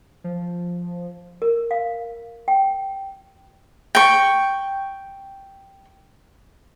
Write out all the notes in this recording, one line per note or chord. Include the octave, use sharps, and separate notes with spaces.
F3
A#4
F5
G5
G5 C#6